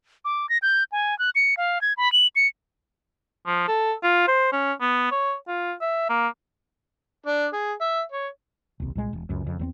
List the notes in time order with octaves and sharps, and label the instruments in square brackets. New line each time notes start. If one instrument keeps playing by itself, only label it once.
[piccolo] D6
A#6
G6
G#5
F#6
C#7
F5
G#6
B5
F#7
C#7
[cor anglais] F3
A4
F4
C5
C#4
B3
C#5
F4
E5
A#3
[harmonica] D4
G#4
E5
C#5
[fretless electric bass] D#1 C2
C2 A#2 G#3
E1
C#2 F#2
F2 C#3
E2 F#3 C4